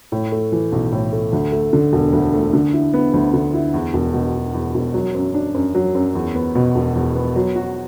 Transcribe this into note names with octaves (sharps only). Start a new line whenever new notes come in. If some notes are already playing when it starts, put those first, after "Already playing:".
A2
A3
E3
B1
A2
A3
D2
A3
D3
E1
D2
A3
D3
E4
B3
D2
D3
E4
E2
E1
B2
E1
E2
E1
F#3
F#2
D4
F#2
F#3
F#2
E2
B3
B2
E1
E2
B3
F#3
F#4